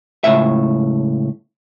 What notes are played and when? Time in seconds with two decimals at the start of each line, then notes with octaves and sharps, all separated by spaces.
0.24 C#2 A2 E5